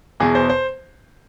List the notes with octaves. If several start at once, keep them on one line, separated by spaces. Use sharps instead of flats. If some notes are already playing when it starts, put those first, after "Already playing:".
E2 B2 G#4
C5
C5